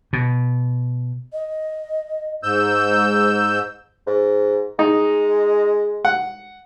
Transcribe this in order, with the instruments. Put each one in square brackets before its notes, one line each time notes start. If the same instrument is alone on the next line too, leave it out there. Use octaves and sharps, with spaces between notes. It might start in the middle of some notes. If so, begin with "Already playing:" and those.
[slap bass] B2
[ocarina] D#5
[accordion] G#2 E6 G6 [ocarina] C5
[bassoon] G#2
[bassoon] G#3 [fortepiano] D#4
[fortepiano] F#5